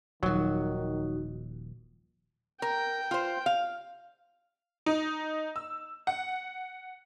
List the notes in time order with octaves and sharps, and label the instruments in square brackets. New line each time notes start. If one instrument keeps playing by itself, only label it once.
[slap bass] D#1 F3 [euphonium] D#3 [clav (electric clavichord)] F#3 [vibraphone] D#4 F#4
[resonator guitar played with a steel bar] A#4 [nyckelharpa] G5
[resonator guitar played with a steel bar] F4 C5
F5
[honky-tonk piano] D#4
E6
F#5